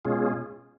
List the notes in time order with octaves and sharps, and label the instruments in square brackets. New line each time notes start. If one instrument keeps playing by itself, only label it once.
[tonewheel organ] B2 G#3 C#4 F4 G#4